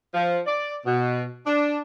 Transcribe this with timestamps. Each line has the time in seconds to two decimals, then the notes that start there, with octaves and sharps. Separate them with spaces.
0.14 F3
0.47 D5
0.86 B2
1.46 D4